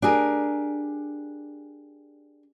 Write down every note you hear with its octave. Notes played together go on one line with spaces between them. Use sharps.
D4 G4 G#4 A#4